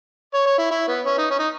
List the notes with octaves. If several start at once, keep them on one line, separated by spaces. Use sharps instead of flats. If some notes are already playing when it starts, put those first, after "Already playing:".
C#5
C#5
E4
E4
B3
C#4
D#4
C#4
D#4